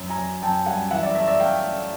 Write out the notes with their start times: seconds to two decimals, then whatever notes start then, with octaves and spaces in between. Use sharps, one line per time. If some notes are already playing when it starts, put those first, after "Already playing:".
Already playing: F#2
0.10 G#5 A#5
0.18 F#2
0.42 F#2 G5 A5
0.66 G3 F#5 G#5
0.91 E3 E5 F#5
1.03 D5 E5
1.15 A3 D5 E5
1.28 D5 E5
1.40 A3 F5 G5
1.64 A3